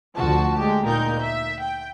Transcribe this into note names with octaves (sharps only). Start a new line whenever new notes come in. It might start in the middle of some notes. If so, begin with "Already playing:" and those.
D2 F3 F#4 A5
G#3 G4
A#2 D#4 A#4 G6
E5
G5